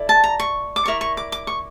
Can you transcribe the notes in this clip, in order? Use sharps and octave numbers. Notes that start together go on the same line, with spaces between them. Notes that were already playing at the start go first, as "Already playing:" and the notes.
Already playing: E4 A4 D5
A5
A#5
C#6
D6
E4 A#4 D5 C#6
C#6
D6
D6
C#6